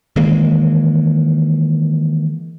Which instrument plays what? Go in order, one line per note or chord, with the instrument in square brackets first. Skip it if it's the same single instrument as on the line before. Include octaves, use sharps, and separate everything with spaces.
[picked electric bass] D#3 E3 G#3 A#3